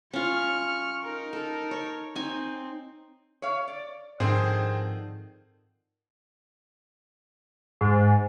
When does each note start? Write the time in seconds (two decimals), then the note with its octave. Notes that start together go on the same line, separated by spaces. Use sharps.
0.13 C#4 F4 C#6 F6
1.03 D#4 A#4
1.33 A4
1.71 C#5
2.16 C4 D#4 G#5
3.42 C#5 F5
3.68 D5
4.20 G#2 D3 D#3 F3 C4 G#4 C5
7.81 G#2